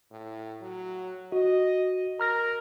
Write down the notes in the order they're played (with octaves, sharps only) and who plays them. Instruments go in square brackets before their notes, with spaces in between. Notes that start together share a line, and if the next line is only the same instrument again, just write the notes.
[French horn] A2
F#3
[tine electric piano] F#4 [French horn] D#5
[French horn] A#4 [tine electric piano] A#5 F6 A#6